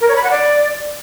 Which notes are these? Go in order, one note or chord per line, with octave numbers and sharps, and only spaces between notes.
A#4
C#5
B5
F#5
D5